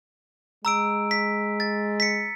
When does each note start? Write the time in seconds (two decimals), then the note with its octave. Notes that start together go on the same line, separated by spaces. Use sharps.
0.65 G#3 A#5 E6 D7
1.11 B6
1.60 A6
2.00 B6 C#7